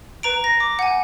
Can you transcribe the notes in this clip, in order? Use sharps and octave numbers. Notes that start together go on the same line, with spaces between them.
B4 A#5 D7
A#6
D6
F#5 G#5